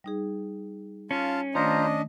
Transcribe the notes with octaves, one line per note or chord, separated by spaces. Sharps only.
G3 D#4 G#4
C#4 F4 F5 A5
D#3 A3 D4 F4 C5 D#5 A#5